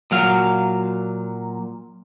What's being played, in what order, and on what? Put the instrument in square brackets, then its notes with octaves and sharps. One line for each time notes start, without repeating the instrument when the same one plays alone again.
[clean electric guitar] A#2 F#3 F5